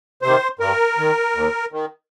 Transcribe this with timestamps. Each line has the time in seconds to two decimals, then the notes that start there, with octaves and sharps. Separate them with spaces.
0.22 C3 D#3 C5
0.59 G2 A#4
0.98 D#3
1.35 D#2
1.72 D#3